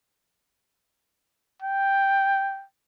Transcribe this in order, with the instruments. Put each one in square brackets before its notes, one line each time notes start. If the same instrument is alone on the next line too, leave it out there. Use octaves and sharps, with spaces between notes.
[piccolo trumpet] G5